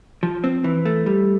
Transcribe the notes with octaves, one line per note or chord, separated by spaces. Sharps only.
F3
C4
E3
A3
G3